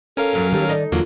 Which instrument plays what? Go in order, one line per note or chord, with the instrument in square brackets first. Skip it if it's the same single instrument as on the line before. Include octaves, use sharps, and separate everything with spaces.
[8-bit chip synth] C#4 A#4 F5 [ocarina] A4
[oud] F#2 F#3 A#3
[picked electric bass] D#3 [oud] F#3 A3 [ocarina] G4
[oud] D#4 [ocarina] D5
[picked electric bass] E2 [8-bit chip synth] D3 F#3 A#3 [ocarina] F4